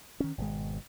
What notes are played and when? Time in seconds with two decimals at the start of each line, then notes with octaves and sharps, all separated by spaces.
0.20 D#3 C#4
0.38 G#1 B2 D#3 G#3